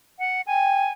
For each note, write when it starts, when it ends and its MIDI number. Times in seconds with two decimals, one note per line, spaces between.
0.19 0.41 78
0.47 0.85 79
0.47 0.92 80